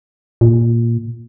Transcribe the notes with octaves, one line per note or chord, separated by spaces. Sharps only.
A#2